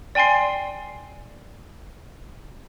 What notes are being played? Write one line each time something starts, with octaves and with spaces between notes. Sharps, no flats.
D5 G5 G#5 C6 C7